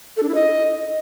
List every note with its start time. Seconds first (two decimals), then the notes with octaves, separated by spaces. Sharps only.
0.17 A4
0.23 D4
0.29 E4
0.35 D#5